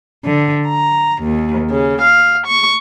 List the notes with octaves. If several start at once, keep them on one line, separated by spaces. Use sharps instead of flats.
D3
A#5
D#2
C#3
F5
C#6